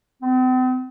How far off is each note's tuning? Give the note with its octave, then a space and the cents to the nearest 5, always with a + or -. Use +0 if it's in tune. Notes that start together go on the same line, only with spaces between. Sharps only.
C4 -45